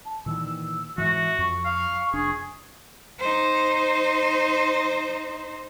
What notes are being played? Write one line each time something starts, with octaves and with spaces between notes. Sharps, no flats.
A5
A#2 D#3 E3 E6
G#2 E3 F#4 E5
F2 C#6
F5
F1 D4 G#4
D#4 C5